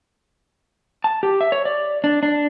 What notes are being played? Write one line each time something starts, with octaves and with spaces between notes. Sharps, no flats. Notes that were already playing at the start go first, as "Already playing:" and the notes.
A5
G4
E5
C#5
D5
D4
D4